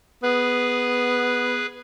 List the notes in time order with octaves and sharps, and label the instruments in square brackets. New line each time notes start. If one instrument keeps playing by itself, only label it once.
[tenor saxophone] B3 [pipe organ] G#4 B4